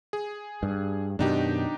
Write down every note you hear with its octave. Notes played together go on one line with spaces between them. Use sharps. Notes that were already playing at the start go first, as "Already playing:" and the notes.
G#4
G2
F#2 B2 D#3 D4 D#4 G4